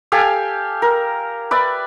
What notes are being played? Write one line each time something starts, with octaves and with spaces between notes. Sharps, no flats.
G4 A4 F5 G#5
A#4
B4 D5 E5